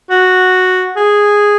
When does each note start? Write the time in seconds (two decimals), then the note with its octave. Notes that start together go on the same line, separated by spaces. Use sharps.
0.10 F#4
0.96 G#4